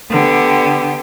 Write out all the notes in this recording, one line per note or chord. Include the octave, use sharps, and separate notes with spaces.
D3 B3 G4